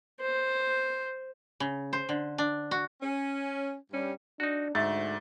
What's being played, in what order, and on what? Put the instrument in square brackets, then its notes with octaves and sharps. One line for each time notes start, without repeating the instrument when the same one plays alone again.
[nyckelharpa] C5
[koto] C#3
C5
D3
D4
F#4
[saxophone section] C#4
G2 G3 C#4
[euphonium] D4 [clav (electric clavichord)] D#4 F#4
[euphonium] D2 [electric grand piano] G#2 [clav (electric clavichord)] A3 [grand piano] E5 A6